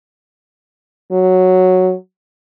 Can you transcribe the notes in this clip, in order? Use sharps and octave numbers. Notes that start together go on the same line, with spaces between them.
F#3